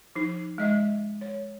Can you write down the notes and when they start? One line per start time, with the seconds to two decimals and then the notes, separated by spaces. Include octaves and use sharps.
0.15 F3 D#4
0.58 G#3 D#5 E5
1.21 C#5